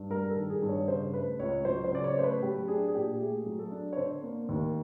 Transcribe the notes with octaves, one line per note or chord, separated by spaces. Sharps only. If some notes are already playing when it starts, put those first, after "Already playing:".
Already playing: G2
G3 A#4
A4
D#3
G#4
G2
C#5
C#3 C5
A3 B4
C#2 C#5
F#3 C5
C5
C#3 D5
C#5
A3 C5
B4
F#3 G4
D4 G#4
G#4
A#2 G4
A3 G#4
F#3
A4
D4
C#5
D3 C5
A#3
D#2